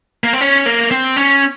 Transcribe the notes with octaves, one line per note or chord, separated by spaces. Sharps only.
A#3
C4
C#4
A#3
C4
C#4